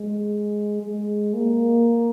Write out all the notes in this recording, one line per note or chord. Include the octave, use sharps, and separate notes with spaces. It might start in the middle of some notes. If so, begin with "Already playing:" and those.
Already playing: G#3
G#3
A#3